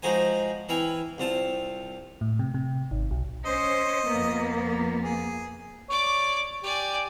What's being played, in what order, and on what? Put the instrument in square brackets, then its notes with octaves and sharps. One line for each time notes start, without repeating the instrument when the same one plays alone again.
[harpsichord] F3 G#3 D#4 F#4 C5 G#5
E3 E4 F5 G5 G#5
C2 C4 F4 A5
[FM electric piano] A2
C3
C3
G#1
B1
[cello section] C#4 C5 [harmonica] D#5
[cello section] F2 A#3 B3
[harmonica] G#4
[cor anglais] C#5 [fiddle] D5 D6
[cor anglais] G4 [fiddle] D5 G#5